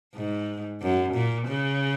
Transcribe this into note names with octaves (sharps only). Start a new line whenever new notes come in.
G#2
F#2
A#2
C#3